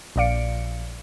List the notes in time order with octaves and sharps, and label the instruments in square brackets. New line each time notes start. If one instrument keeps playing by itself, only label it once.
[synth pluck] A#1 A#2 D5 F5 C#7 D7